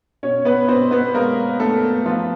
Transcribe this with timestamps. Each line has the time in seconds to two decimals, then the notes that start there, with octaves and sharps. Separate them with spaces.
0.23 B2 C#4 C#5
0.45 B3 B4
0.68 B2 C4 C5
0.91 B3 B4
1.14 G#3 A#3 A#4
1.60 A3 B3 A4
2.06 F3 B3 F4